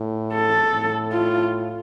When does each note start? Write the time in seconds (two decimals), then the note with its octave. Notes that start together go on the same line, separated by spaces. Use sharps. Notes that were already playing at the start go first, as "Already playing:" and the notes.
Already playing: A2
0.33 A4
0.73 A2
1.12 F4